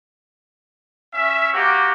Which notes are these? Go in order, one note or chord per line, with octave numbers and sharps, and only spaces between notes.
C#4 E5
A#3 F#4 G4